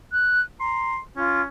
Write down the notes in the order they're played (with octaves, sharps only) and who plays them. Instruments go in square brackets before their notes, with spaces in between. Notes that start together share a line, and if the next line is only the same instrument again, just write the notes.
[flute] F#6
[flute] A#5 [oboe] C6
[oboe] C#4 [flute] F4